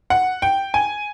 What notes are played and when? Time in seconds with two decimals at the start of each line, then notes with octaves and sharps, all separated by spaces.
0.10 F#5
0.42 G5
0.74 G#5